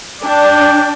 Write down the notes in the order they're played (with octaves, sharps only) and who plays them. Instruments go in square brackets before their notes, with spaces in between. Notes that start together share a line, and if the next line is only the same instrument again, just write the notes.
[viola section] D4 [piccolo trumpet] G5